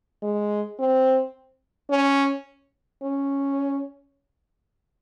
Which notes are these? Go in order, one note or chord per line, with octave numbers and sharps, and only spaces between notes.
G#3
C4
C#4
C#4